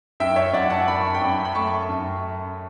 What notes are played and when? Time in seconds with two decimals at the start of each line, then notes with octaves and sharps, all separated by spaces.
0.20 F#2 E5 G5
0.36 C#5 E5
0.53 F#2 D5 F#5
0.70 F#5 A5
0.88 F#2 B5
1.01 C#6
1.14 G5 B5
1.21 F#2
1.45 B5
1.55 A3 A5 C#6
1.89 F#2